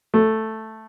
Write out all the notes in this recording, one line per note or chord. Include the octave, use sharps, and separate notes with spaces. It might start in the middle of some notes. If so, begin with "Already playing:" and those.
A3